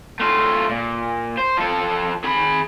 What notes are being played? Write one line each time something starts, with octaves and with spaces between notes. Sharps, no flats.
A3 F4
A#2
C5
F3 A4
G#4 B5